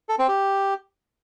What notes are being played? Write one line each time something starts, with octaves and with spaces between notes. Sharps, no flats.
A4
C4
G4